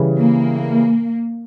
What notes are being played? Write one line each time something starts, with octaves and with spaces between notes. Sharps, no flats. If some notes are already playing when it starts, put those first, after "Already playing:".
Already playing: C#3 E3 G3
A#3